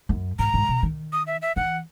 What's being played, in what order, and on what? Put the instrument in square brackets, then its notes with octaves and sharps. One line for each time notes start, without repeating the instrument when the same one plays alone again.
[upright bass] F#2
[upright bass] G#2 [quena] A#5
[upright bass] G#2
B2
D#3
[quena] D#6
E5
E5
[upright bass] E3 [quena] F#5